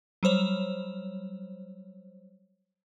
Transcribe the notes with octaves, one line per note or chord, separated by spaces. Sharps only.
F#3 G3 C5 C#5